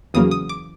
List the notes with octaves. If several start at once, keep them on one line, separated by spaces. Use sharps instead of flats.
E2 C#3 F#3 A#3 D#6
D#6
D6